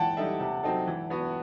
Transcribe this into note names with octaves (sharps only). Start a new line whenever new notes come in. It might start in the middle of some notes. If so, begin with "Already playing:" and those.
Already playing: E3 F#5 G5 A5
G3 D#4 A4 E5
C3
F#3 C4 D#4 A4
E3
B3 F#4 B4